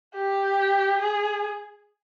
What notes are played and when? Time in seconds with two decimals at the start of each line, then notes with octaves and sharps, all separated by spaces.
0.14 G4
1.00 G#4